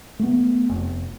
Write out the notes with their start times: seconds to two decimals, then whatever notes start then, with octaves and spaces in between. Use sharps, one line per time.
0.19 A3 B3
0.69 F1